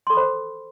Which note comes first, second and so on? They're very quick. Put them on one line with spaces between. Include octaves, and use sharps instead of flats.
C6 A4 B5 C5